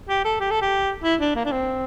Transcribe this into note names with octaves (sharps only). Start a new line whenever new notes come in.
G4
A4
G4
A4
G4
E4
D4
A#3
D4
C4